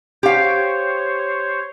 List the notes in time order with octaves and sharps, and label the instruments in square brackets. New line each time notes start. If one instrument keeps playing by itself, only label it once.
[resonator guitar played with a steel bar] G4 F5 [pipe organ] C5 C#5